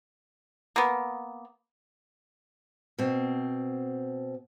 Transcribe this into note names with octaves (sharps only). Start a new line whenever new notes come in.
A#3 B3
B2 C4